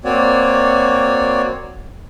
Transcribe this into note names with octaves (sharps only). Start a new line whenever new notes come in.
A#3 C4 F#4 C#5 D5